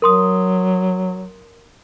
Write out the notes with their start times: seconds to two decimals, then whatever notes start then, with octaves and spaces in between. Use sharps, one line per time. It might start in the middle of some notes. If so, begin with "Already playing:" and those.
0.02 F#3 A#4 C6 D#6